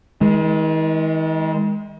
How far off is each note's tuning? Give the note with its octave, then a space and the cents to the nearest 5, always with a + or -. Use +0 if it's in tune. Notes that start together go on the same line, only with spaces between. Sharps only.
D#3 +45 G#3 +0